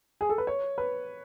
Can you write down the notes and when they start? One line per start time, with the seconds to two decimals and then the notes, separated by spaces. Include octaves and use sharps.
0.21 G#4
0.29 A4
0.38 B4
0.47 C#5
0.78 B4